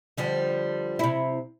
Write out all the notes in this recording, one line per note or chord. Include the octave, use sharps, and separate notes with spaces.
D3 F3 G3
C3 E4